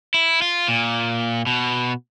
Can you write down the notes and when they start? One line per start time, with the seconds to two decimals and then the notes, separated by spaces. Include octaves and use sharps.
0.14 E4
0.42 F4
0.68 A#2
1.47 B2